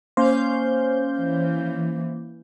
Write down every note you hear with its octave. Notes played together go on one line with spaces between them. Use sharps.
A#3 C#4 C5 F5 G6
E3